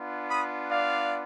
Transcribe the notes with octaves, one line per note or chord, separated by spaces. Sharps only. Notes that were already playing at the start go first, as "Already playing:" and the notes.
Already playing: B3 D4 F4
B5 D#6
D5 F5